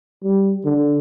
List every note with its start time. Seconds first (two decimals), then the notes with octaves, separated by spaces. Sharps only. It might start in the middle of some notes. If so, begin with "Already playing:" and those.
0.23 G3
0.65 D3